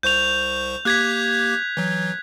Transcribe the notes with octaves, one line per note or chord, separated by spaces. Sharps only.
C2 C5 C#6 G6 F7
A#3 G4 D6 F#6 G#6 B6
E3 F#3